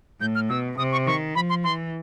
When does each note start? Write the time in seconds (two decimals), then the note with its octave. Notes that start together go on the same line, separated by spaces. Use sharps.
0.21 A2 G6
0.35 F6
0.49 B2 E6
0.78 C3 D#6
0.92 C#6
1.07 D#3 C#6
1.35 F3 B5
1.50 C6
1.64 E3 C6